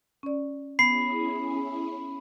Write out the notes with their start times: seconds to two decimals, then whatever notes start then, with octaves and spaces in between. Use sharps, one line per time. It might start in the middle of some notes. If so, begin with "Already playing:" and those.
0.23 C#4 D5
0.79 B3 C#4 E4 G#4 B5 C7